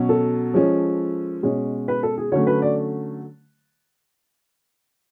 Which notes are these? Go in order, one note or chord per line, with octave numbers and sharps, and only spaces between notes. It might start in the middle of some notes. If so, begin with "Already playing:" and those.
Already playing: B2 F#3 C#4
A4
F3 G#3 C#4
B2 G#3 C#4
B4
A4
G#4
D3 F#3 A3 C#4 C#5
B4
D5